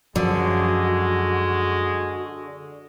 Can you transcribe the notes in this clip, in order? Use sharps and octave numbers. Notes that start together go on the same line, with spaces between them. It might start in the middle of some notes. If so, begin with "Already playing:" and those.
F#2 D3 F3 G#3 F#4